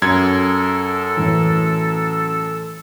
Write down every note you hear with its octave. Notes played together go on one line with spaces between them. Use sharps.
F#2 A4 G#6
A2 E3